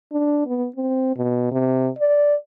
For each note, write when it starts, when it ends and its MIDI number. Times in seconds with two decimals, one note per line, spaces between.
0.12 0.44 62
0.46 0.67 59
0.76 1.16 60
1.16 1.52 47
1.52 1.88 48
1.99 2.35 74